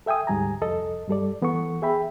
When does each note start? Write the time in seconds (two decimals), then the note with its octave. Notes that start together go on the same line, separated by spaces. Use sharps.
0.06 A4 E5 G5 G#5 D#6
0.27 D2 G#2 G3 G#5 A#5
0.61 C2 F2 A4 D#5
1.08 G2 G3 A4 D5
1.42 E3 B3 A4 F#5 C#6
1.82 G#4 E5 G5 B5